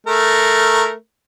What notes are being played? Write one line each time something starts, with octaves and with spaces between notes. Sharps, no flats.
A3 A#4